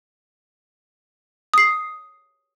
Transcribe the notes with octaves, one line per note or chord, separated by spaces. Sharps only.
D#6 C7